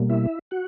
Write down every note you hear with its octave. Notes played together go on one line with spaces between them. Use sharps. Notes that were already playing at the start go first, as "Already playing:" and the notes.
Already playing: B2 G3 A#3
E4 E5
F#4 F#5